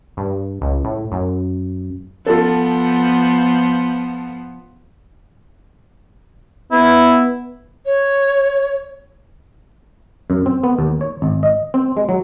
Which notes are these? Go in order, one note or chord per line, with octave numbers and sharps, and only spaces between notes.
G2
C#2
A2
F#2
F3 B3 F4 A4
B3 E4
C#5
F#2
C4
B3
D#2
C#5
G#1
D#5
C4
G#3
F#3